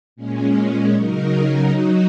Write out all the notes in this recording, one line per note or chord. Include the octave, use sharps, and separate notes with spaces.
A#2 G#3 C#4
C#3 F#3 D#4 A#4
F#3 D#4 F#4